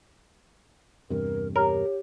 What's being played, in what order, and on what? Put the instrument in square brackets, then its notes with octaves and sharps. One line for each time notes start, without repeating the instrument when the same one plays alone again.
[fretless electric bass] E2 G2 C3 [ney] A#4
[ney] G4 [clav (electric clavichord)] A#4 [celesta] C#5